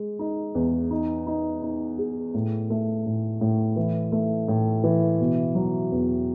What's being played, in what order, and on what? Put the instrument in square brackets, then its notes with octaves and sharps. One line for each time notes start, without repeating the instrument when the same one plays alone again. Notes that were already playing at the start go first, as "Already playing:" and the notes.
Already playing: [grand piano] G#3
D#4
E2
D#4
D#4
D#4
G#4
A2
A3
A2
A2
E3
A3
A2
E3
B2
F#3
E2